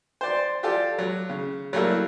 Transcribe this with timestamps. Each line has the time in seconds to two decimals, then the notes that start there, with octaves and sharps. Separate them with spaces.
0.21 C5 D5 C6
0.63 F4 G4 A4 D5
0.99 F#3
1.29 C#3
1.73 F#3 G3 A3 A#3 E4